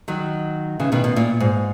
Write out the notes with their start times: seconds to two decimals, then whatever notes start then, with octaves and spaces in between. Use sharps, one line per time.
0.08 D#3 F#3
0.80 C#3 E3
0.92 B2 D#3
1.04 B2
1.16 A#2
1.40 G#2